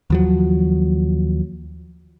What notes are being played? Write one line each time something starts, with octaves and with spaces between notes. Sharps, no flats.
D#2 F3 F#3